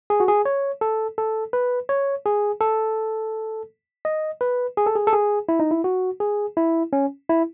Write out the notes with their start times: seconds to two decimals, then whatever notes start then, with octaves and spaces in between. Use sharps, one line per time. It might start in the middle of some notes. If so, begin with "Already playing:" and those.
0.10 G#4
0.20 F#4
0.28 G#4
0.45 C#5
0.81 A4
1.18 A4
1.53 B4
1.89 C#5
2.26 G#4
2.61 A4
4.05 D#5
4.41 B4
4.77 G#4
4.86 A4
4.95 G#4
5.07 A4
5.13 G#4
5.49 E4
5.60 D#4
5.71 E4
5.84 F#4
6.20 G#4
6.57 E4
6.93 C#4
7.29 E4